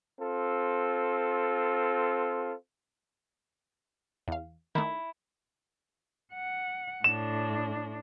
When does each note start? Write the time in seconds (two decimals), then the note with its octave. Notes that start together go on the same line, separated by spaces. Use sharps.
0.19 C4 F4 A4
4.28 E2 F5
4.75 D#3 A3 E4
6.33 F#5
7.04 A2 D4 E7